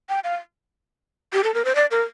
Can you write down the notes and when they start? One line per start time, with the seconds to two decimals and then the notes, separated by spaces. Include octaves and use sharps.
0.09 G5
0.24 F5
1.33 G4
1.44 A4
1.54 A#4
1.65 C5
1.75 D5
1.91 A#4